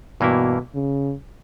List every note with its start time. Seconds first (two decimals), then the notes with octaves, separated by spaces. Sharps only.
0.21 G2 B2 E3 A#3 E4
0.75 C#3